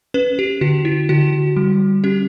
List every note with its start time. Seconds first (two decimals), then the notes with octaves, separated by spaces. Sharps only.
0.14 C#4 B4
0.39 G4
0.61 D3 F#4
0.85 E4
1.09 D3 F#4
1.56 G3
2.04 C#4 G4